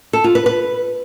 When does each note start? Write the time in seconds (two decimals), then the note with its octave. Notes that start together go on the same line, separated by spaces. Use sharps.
0.13 A4
0.24 F4
0.35 B4
0.46 B4